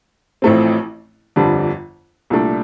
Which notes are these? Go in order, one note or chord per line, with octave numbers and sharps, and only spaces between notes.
A1 A2 F3 A3 C4
G1 F2 D3 G3 D4
C2 A#2 A3 D4